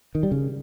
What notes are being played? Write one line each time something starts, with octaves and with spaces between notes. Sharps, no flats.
D#3
G3
C#3